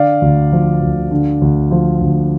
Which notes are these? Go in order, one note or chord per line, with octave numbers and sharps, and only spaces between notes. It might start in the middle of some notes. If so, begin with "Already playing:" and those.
Already playing: D3 D5 F5
D2
F3
D2
D3
D2
F3
D2